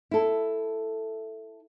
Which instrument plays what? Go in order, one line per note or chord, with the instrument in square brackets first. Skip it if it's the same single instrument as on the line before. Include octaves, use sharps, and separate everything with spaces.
[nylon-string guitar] E4 A4